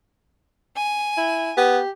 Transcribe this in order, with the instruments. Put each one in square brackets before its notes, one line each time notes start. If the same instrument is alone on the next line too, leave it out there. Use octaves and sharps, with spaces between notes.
[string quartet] G#5
[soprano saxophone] E4
[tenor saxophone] B3 [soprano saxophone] G4